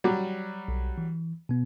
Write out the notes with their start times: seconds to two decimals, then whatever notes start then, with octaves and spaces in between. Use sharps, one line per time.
0.04 F#3 G3
0.68 B1
0.98 E3
1.49 B2 B3